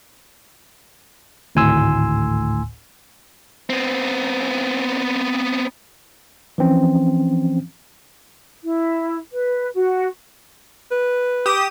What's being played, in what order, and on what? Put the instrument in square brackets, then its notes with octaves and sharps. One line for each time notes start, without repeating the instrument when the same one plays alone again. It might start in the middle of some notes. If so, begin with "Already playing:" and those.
[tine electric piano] G#1 D2 A2 G#5 C6 E6
[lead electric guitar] B3 C4
[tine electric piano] E3 F3 C4 C#4
[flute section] E4
B4
F#4
[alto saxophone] B4
[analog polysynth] G4 D#6 E7